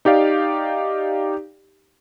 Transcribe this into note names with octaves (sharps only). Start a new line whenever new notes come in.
D#4 G4 D5 F5